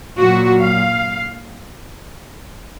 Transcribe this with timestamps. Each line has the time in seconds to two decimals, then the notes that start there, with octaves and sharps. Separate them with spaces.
0.17 A#2 F#3 F#4
0.60 F5